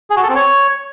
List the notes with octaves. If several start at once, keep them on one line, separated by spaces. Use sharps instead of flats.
G#4
F#4
A4
C4
C#5